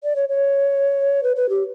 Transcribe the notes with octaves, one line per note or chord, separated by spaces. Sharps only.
D5
C#5
C#5
B4
B4
G4